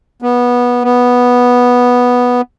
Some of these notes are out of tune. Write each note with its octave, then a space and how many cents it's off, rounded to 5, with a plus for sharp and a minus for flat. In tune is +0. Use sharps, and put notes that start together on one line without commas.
B3 -15
B3 -5